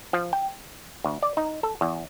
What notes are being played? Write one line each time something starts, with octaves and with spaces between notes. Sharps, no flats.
F3
G5
D2
D5
D#4
A4
E2